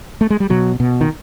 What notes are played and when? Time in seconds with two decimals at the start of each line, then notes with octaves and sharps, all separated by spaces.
0.21 A3
0.30 G#3
0.40 G3
0.50 B2 F#3
0.80 B2
1.01 D#3